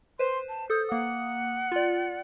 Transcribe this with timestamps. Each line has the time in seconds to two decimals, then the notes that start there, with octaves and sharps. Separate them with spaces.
0.19 B4 C5 C6
0.49 A5
0.70 A4 D#6 G6
0.89 A#3 F#5 D#6
1.72 F4 D5